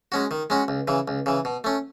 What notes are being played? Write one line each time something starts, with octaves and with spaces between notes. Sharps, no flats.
G#3 C#4 F#4
D#3
G#3 C#4 F#4
C#2
C#3 E3
C#2
C#3 E3
B2
A3 C#4